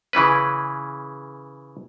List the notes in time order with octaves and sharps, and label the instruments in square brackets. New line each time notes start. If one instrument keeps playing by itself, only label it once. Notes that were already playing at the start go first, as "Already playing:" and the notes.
[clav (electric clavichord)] C#3 E3 C#4 B4